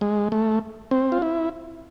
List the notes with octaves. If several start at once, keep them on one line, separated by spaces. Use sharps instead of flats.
G#3
A3
C4
F4
E4